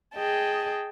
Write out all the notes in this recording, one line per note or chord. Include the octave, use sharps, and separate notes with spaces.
G#4 D#5 G5 A5